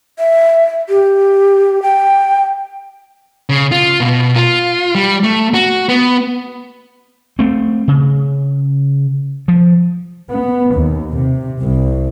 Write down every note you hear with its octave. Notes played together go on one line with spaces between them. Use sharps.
E5
G4
G5
C#3
F4
B2
F4
G3
A3
F#4
B3
A3 C4
C#3
F3
B3
D#2
C3
C2